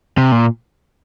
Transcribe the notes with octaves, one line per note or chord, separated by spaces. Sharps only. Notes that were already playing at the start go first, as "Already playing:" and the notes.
C3
A#2